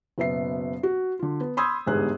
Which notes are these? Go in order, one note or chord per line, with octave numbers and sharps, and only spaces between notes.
F#1 B2 B3 E5 C7
F#4
D3 F4
B3
B5 C6 D#6 E6 G6 G#6
G1 E2 G#2 G3 G#4 F#6